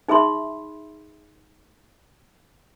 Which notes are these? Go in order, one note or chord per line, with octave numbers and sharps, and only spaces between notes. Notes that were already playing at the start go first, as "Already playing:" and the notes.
D#4 G#4 E5 B5 C6